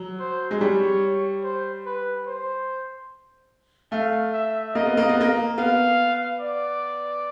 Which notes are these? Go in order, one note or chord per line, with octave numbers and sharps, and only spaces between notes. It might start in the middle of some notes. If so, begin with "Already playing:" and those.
Already playing: F#3
C5
G#3
G3 C#5
C5
B4
C5
A3 F5
E5
A#3 D#5
B3
A#3
B3
A#3
B3 F5
D5